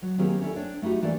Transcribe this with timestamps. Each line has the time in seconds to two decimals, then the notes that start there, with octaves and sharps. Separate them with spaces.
0.02 F#3
0.18 D#3 F#3 A#3 C4 G4 G#4
0.41 C#4 D4 E4 A4
0.56 D4 C5 C#5 G5
0.82 A3 D#4 E4 F#4 G4
1.02 E3 A3 A#3 D4 G4 D5